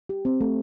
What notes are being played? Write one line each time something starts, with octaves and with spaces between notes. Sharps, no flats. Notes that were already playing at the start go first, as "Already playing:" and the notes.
G4
C4
A3